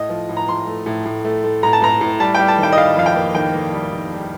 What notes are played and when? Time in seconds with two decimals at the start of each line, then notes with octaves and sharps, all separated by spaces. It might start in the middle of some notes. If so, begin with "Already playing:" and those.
Already playing: A2 D#5
0.09 F3
0.29 A2
0.37 A#5
0.48 F3 C6
0.67 A3
0.86 A2
1.05 A2
1.25 A3
1.44 A3
1.63 A2 A#5
1.73 A5
1.81 A2 A#5
2.01 A2
2.20 G3 A5
2.35 G3 G5
2.48 A5
2.58 D#3
2.63 G5
2.73 D#5
2.78 G3 F5
2.97 F2 F5
3.06 G5
3.15 A#3
3.35 D#3 G5
3.54 A#3
3.73 G3
3.92 D#3
4.11 G3